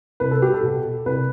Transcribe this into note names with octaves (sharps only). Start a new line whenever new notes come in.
C2 B4
A4
G4
A4
B2
C2 B4